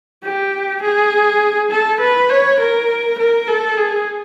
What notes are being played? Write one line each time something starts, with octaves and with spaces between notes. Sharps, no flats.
G4
G#4
A4
B4
C#5
A#4
A#4
A4
G#4